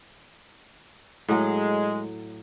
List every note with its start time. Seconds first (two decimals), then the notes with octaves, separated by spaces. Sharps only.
1.29 A2 F#3 G#3